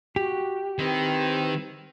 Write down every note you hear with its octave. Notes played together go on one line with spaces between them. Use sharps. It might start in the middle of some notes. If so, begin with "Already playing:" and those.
F#4 G4
D#3 C4 E4 B4